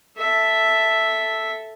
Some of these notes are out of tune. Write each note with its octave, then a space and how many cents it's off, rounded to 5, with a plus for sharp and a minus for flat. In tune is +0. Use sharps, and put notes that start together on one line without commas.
A4 +0 E5 +0